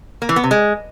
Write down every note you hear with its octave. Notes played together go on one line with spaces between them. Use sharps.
A#3
E3
B3
C3
G#3